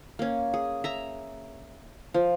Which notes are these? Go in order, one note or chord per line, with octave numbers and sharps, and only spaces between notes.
A#3 C#4
G#4
E5 A#5
F3